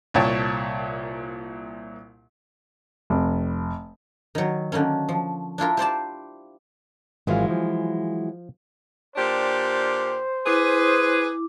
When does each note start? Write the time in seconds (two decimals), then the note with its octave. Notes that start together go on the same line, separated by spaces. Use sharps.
0.14 C2 A#2 C#5 G5 A5
3.10 F1
4.35 D#3 F#3
4.72 D3 D#3 A#3 C#4
5.09 F3
5.58 D4 E4 F4 A#4
5.77 G4 C5 D5 A5
7.27 G#1 E3 F#3 G#3 F4 F5
7.50 F3
9.16 A#2 D4 G4 C5
10.46 E4 G#4 B4 D6